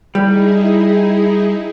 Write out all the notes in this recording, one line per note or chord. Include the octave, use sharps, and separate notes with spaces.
G3 D#4 E4 G#4